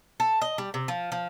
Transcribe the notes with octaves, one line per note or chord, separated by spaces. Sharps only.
A4
D#5
G3
C3
F3
F3